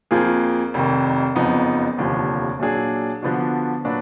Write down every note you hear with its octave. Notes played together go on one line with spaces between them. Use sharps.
F2 F3 A#3 F4 G#4
F1 F2 D#3
F#1 F2 F3 B3 D#4
F1 D#2 D3 F3
A#2 F#3 D4 G#4
D3 F3 B3 D4 F#4
A#2 F#3 D4 F#4 B4